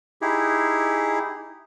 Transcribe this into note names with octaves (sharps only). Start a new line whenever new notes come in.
D#4 E4 G4 G#4